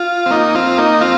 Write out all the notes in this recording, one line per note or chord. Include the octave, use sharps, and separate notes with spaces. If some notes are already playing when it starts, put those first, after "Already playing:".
Already playing: F4
C4
A#3 D#4
C4 F4
A#3 D#4
C4 F4